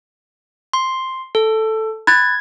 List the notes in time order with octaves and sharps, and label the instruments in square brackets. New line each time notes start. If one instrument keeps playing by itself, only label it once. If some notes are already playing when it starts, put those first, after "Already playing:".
[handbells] C6
A4
[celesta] B5 F#6 A6 [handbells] G#6